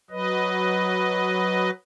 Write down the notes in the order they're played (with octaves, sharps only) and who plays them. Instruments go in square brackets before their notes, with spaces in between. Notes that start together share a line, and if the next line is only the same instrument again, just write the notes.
[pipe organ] F#3 B4 D#5